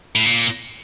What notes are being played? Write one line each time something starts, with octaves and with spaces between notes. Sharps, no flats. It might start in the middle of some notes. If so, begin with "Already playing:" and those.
A2
A#2